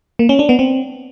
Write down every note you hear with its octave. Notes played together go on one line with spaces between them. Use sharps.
A#3
C#4
D4
B3
C4